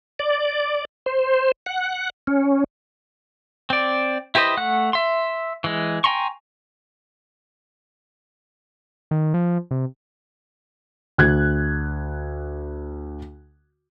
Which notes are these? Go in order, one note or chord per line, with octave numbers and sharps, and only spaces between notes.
D5
C5
F#5
C#4
C4 D5
E4 G4 B4 C5 D#5
A3 F#5 F#6
E5 C6
E3 G#3
G5 G#5 A#5 C6 C#6
D#3
F3
C3
D2 F#6 G#6